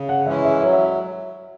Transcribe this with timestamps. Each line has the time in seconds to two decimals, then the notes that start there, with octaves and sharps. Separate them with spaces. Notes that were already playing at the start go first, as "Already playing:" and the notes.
Already playing: C#3
0.09 F#5
0.26 E3 G#3 C#4 E4 E5
0.45 E5
0.63 F#3 C#5
0.73 E5